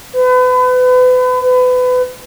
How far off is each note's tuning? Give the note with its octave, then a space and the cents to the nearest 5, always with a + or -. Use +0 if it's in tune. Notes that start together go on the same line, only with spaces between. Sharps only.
B4 +35
B4 +30